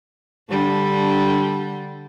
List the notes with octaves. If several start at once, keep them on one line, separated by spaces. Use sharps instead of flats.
D3 G3 D4